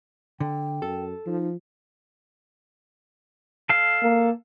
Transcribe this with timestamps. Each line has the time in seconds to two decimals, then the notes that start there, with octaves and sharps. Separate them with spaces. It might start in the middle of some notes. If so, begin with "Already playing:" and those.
0.40 D3 G5
0.82 F#2 A4
1.26 F3 D#4
3.69 A4 F5
4.03 A#3